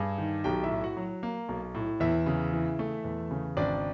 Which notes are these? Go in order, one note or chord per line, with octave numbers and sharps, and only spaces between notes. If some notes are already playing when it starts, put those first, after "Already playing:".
Already playing: G2 G#4
D#3
B1 G4 G5
E4 E5
A2
F#4 F#5
F#3
A#3
B1
A2
E2 E4 E5
C#3
E3
A3
E2
C#3
G#1 D4 D5